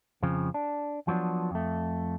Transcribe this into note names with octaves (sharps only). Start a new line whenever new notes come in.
F2 C#3 F3
D4
F3 F#3 B3 D4
F2 A3